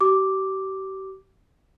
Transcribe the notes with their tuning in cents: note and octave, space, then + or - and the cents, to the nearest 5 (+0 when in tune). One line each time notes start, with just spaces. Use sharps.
G4 -40 D6 +0